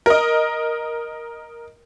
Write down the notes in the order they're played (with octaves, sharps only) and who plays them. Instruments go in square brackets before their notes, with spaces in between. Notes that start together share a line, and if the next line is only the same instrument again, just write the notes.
[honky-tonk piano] A#4 D#5